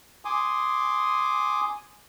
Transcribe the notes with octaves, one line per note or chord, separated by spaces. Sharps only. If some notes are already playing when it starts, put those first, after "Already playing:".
G#5 C6 D6 D#6